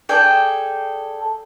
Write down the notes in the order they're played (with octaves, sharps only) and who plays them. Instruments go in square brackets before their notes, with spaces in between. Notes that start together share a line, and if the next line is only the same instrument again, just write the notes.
[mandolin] G#4 A4 D5 G5